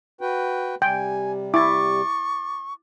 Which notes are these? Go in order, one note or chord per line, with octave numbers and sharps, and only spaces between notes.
F#4 B4 G5
C3 G3 G5 G#5
E4 C#6 D6 A6